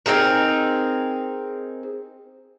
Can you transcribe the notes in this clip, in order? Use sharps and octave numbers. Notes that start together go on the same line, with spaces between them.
C4 D#4 G#4 A#4